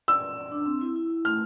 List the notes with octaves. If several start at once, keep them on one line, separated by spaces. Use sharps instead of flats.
D5 E6
D5
D5
D4
C4
E4
E4
E4
A3 F6